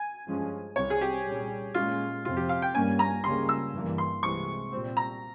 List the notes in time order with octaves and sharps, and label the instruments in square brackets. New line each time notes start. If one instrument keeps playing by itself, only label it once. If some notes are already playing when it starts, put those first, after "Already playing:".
Already playing: [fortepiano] G#5
[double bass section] G2 F3 G#3 C#4
[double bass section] C2 C3 G3 C4 [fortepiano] C#5
[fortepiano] G#4
G4
[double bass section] A#2 G3 C#4
[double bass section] A#2 G#3 C#4 [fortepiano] F4
[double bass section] F2 C3 F3 C4 [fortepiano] F4
[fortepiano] G4
F5
G5
[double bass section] G2 G3 A#3 C#4 [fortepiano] G#5
[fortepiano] A#5
[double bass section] C#2 C#3 G3 A#3 C#4 [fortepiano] C6
[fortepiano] E6
[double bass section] G2 E3 A#3
[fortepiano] C6
[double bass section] C2 C3 E3 G#3 [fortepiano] C#6
[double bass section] A#2 G3 C4
[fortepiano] A#5